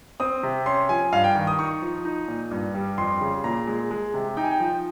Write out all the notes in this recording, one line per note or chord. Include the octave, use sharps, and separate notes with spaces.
C4 D#6
C3
C#4 C6
F3 G#5
G2 F5
G5
D#3
D#6
D#4 C#6
F3
D#4
A#2
G2
G3
F2 C6
C#3
A#2 A#5
G#3
G#3
C3
D#4 G5
G#5
G5
F3